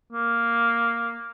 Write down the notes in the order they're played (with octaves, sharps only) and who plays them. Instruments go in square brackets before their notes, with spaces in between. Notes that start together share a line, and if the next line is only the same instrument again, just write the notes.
[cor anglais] A#3